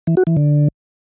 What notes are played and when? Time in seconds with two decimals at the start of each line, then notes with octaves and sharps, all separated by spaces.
0.07 E3
0.17 F#4
0.27 E3
0.37 D3